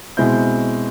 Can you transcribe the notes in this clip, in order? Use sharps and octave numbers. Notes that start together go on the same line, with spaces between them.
B2 G#3 C4 E4 G6